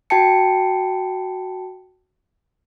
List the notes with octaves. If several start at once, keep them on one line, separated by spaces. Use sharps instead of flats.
F#4 G5 A5 C#7